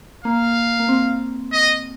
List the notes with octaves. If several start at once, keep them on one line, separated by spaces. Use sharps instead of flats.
A#3 F5
A#3
C4
D#5